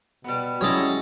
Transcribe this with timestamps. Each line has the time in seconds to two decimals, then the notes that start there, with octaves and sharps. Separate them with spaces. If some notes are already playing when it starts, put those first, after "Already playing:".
0.24 B2 G3 B3
0.61 F#3 G#3 C#4 E4 C#5 D#5 A5